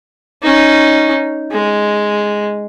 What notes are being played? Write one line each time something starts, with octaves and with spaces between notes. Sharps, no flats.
C#4 D#4
G#3